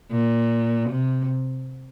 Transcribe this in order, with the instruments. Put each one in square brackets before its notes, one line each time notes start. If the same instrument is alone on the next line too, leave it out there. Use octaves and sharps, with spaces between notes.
[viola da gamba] A#2
C3